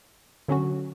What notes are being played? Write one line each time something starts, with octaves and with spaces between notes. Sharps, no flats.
D3 F#3 C#4 F#4